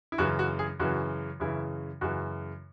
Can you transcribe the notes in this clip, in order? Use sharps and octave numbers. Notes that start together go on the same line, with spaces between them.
E4
F#2 C#3 E3 F#4
F#4
G#4
F#2 C#3 E3 F#4
F#2 C#3 E3 E4
F#2 C#3 E3 F#4